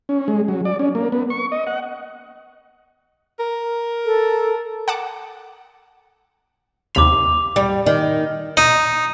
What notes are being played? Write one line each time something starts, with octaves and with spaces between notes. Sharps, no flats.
C#4
G#3
F#3
D5
C#4
A#3
B3
C#6
D#5
F#5
A#4
A4
F#5 A5 D6
D#2 C3 B5 D6 F7
G3
D#3
D#4